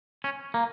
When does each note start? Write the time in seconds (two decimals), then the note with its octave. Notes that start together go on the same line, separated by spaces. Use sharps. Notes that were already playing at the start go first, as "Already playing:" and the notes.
0.24 C#4
0.54 A#3